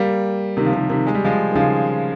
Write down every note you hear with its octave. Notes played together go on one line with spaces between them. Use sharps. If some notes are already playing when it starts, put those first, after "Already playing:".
Already playing: G3 A#3
C3 D#3
F3
C3 D#3
C3 D#3
G#3
G3
F3 G#3
D#3
C#3 F3